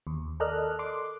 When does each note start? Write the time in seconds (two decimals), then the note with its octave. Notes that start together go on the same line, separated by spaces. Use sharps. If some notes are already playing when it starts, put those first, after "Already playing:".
0.07 D#2
0.40 A4 A#4 D5 D#5 F6 F#6
0.79 C6 D6